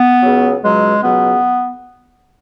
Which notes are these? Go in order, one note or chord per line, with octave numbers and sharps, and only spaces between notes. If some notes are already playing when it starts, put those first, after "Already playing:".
Already playing: B3
C#2 C#3 F#3
C#2 B2 F#3 G#3
C#2 B2 F#3 B3